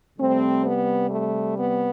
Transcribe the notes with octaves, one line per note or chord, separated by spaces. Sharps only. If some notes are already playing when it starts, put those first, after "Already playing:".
C3 G3 A3 C4
B3
A3
B3